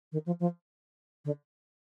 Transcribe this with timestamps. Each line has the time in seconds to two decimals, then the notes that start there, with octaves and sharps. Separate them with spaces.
0.12 D#3
0.26 F3
0.40 F3
1.25 D3